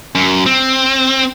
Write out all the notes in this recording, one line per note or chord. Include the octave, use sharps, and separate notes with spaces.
F#2
C4